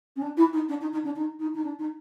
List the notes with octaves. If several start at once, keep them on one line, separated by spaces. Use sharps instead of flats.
C#4
D4
E4
D#4
D4
D#4
D#4
D4
D#4
D#4
D#4
D4
D#4